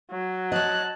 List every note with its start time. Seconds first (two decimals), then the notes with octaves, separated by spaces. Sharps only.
0.11 F#3
0.52 C#5 D#5 A5 F#6